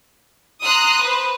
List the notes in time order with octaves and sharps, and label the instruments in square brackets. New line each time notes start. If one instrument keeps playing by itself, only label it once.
[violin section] A#5 C6 D#6 F#6
B4 C5